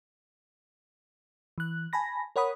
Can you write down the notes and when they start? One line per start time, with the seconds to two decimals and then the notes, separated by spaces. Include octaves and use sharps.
1.58 E3 F#6
1.93 G#5 A5 B5 A#6
2.36 A#4 C#5 F#5 B5 D#6